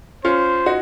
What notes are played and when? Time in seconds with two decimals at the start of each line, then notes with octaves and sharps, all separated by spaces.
0.24 C#4 F4 C5
0.66 D#4 F#4